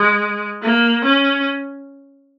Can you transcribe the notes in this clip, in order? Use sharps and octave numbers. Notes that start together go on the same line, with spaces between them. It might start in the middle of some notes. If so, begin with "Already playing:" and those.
Already playing: G#3
A#3
C#4